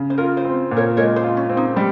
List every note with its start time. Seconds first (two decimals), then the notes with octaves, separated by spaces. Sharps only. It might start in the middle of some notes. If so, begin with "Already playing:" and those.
Already playing: C#3
0.10 C5
0.18 F4 A#4
0.37 C5
0.44 C4
0.71 A#2
0.77 A#4 C#5
0.97 G#3 A#4 C#5
1.16 C5
1.24 F4
1.37 C#4
1.49 C4
1.57 D#4
1.76 G3 G4